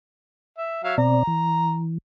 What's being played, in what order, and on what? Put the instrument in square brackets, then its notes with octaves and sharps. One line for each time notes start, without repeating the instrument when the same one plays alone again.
[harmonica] E5
F#3 E5 F5
[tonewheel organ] B2 C4 D5 [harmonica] A#5
[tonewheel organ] E3